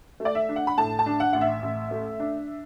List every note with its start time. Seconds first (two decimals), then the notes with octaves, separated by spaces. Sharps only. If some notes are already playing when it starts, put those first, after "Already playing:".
0.20 A3
0.25 D5
0.35 E5
0.49 D4
0.56 F#5
0.67 B5
0.78 A2 A5
0.99 A5
1.06 D4
1.20 F#5
1.33 A1 F#5
1.41 E5
1.62 A1
1.91 A3
2.20 D4